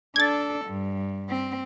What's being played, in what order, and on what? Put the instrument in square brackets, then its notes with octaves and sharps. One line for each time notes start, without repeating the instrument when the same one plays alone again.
[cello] D4 A4 [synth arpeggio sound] G#6 A6
[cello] G2
C4